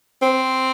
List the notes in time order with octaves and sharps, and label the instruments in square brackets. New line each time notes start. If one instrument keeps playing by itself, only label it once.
[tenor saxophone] C4